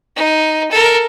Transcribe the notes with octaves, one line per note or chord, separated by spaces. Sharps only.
D#4
A4 A#4